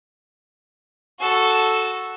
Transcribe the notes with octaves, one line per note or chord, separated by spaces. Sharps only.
F#4 A4